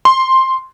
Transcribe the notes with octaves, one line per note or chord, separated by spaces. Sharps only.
C6